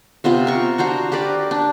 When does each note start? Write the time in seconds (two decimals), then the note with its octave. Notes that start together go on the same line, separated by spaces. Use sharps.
0.24 C3 B3 F4 C5
0.47 A#4 C#6
0.78 D4 F#4 C5 A#5
1.12 G4 A#4 B4 D5
1.51 D4